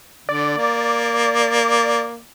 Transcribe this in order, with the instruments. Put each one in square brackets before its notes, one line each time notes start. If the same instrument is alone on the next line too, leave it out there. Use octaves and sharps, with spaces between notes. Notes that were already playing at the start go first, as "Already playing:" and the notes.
[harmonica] D3 [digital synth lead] D5
[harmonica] A#3